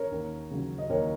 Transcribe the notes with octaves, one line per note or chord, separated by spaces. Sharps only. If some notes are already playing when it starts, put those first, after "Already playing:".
Already playing: A#4 C#5
D#2
C#3 F#3
D#5
D#2 A#4 C#5